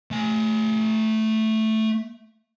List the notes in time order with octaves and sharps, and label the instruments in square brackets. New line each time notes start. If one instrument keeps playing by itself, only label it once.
[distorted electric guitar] A3 G#5